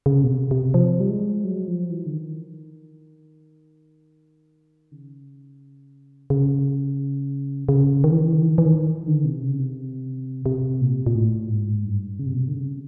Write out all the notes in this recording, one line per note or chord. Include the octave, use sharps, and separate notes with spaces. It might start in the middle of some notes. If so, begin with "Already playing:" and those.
C#3
B2
C3
C3
F3
G3
G#3
F#3
F3
E3
D3
D#3
C#3
C#3
C#3
D#3
E3
D#3
E3
D#3
E3
D#3
E3
D#3
D3
C3
C#3
C3
C3
A#2
A#2
A2
G#2
G2
C#3
C3
B2
C3
D3
C#3